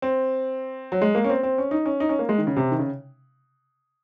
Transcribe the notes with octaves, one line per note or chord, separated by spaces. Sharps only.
C4
F#3
G#3
A#3
C#4
C4
C4
C#4
D#4
C#4
D#4
C#4
A#3
G#3
D#3
C#3
C3
D#3
C#3